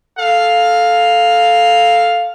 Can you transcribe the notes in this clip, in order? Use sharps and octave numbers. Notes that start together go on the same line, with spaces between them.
A4 F5